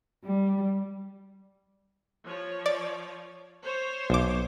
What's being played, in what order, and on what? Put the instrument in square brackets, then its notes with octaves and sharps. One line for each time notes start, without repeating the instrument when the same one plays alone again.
[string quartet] G3
[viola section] F3 C#5
[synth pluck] D5
[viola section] C5 C#5
[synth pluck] B1 D6